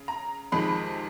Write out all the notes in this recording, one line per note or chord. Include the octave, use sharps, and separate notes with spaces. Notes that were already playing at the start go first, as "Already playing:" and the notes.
Already playing: C#3
A#5
F2 C3 D#3 G#3 B5